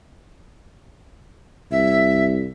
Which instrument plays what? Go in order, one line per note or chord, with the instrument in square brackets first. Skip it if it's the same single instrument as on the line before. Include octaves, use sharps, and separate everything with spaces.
[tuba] C2 [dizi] E5